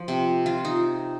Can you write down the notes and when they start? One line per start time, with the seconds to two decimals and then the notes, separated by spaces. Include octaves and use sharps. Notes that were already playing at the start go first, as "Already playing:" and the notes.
Already playing: F3
0.08 C3
0.46 F4
0.65 D#4